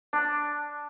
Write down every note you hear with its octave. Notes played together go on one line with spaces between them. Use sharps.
D4